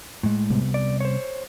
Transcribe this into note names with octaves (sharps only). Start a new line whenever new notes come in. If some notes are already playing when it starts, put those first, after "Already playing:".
A2 G#3
C3 G3 B3
D5
C5 C#5